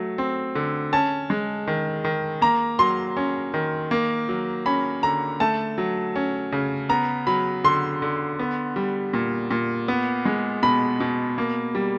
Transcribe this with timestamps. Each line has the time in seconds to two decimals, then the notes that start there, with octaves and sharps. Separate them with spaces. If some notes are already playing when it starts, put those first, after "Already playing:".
Already playing: F#3 A3
0.18 C4
0.55 D3
0.93 C#4 A5
1.30 G#3
1.67 D#3
2.04 D#3
2.42 A#3 A#5
2.79 F#3 C6
3.17 C#4
3.54 D#3
3.91 A#3
4.29 F#3
4.66 C#4 B5
5.03 D3 A#5
5.40 A3 A5
5.78 F#3
6.16 C#4
6.52 C#3
6.89 B3 A#5
7.27 F#3 B5
7.64 D3 C6
8.02 D3
8.39 B3
8.76 G3
9.14 A#2
9.51 A#2
9.88 B3
10.25 G#3
10.63 B2 B5
11.00 B2
11.38 A#3
11.75 G3